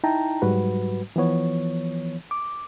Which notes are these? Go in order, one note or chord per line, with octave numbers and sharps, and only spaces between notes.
D#4 E4 G5 A5 A#5
G#2 F#3 G3 F#4 B4
E3 F3 B3 C#5
D6